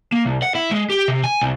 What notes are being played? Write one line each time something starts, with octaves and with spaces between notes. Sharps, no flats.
A#3
C2
F#5
E4
G#3
G4
C3
G#5
C2